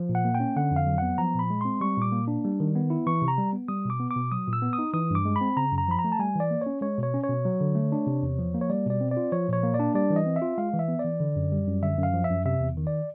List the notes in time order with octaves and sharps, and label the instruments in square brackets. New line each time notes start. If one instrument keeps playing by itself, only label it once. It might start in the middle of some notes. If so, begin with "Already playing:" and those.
Already playing: [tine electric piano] F3
A#2
F#5
A#3
G5
C#4
D3 F#5
F2
F5
F#3
B3 F#5
F3 A#5
A#2
B5
G#3
C4 C6
G3 C#6
A#2 D6
A#3
D4
G3
D#3
B3
E4
E3 C#6
C3
A#5
G3
B3
G3 D#6
B2 D6
B3
D6
B2
F#3 D#6
A#2
E6
B3
D#6
D#4
E3 D#6
G2 D6
G#3
B5
C4
C#3 A#5
F#2
A#5
F3 B5
A#5
A3
A5
G3 G#5
E3 D5
A#3
C#4 C#5
G#3 C#5
B2 C#5
C#4
C#5
B2
F#3
D3
A3
D4
C3
E2
F3
A#3
C#5
G3 D5
B2 D5
C4
D5
F4
F3 C#5
A#2 C#5
A#3
D5
D4
G3 D5
E3
D#5
C4
E5
F4
G#3 F5
E3
E5
B3
D5
E3
D3
F#2
G3
F#2
D3 E5
F#2
F5
F3
E5
F#2
C3 E5
E2
D#3
D5